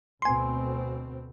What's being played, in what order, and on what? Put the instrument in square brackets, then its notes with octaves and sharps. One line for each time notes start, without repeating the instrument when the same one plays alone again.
[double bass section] D2 B2 C4 [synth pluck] G#5 C6